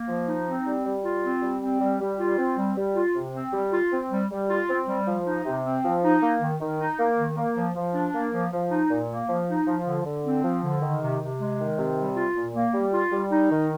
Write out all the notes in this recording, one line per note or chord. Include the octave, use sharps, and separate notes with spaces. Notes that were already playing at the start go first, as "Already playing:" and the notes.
Already playing: A#3
F3
D#4
C4
G3
G3
F4
C4
G3
C4
G3
G3
F4
C4
G3
G3
F4
C3
C4
G3
F4
C4
G3
G3
F4
C4
G3
F3
D#4
C3
C4
F3
D#4
A#3
D#3
D#3
D#4
A#3
D#3
A#3
F3
F3
D4
A#3
F3
F3
D#4
A#2
A#3
F3
D#4
F3
D3
D3
C4
F3
D3
D#3
C3
C3
G#3
D#3
C3
G3
F4
A#2
A#3
G3
F4
G3
D#4
D#3